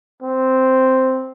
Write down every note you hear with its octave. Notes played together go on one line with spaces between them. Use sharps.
C4